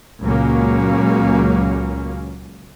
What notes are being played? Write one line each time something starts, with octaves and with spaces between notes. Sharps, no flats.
C#2 A#2 C#3 F#3 A#3 C#4